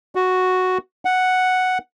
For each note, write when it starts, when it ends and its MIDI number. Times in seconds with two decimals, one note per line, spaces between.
0.15 0.78 66
1.05 1.78 78